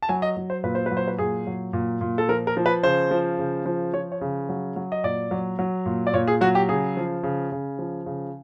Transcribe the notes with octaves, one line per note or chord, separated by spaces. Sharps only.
A5
F#3 G#5
D#5
F#3
C5
A#2 B4
C5
F#3 B4
C5
B4
A#2 G#4
F#3
A#2
A#2
A4
F3 A#4
A#4
F3
B4
C#3 C5
F3
C#3
F3
F3 C#5
C#5
C#3
F#3
F#3
D#5
A#2 D5
F#3
F#3
A#2
D5
A#2 C#5
G#4
F#3 F#4
G4
C#3 G#4
F3
C#3
C#3
F3
C#3